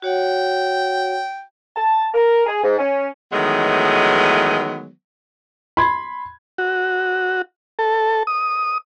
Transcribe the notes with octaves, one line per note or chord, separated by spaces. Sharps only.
F#4 C#5 F#5 G5
A5
A#4
G#4
G#2
C#4
D#3 E3 F#3 G#3 A3 B3
B5 C6 G#6
F#4
A4
D#6